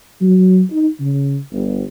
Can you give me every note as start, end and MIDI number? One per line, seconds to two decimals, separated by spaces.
0.21 0.62 54
0.70 0.88 63
1.00 1.38 49
1.52 1.84 31